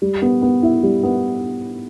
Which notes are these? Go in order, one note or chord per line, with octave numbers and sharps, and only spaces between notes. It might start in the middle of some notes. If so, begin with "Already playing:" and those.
G3
B3
B3
E4
G3
B3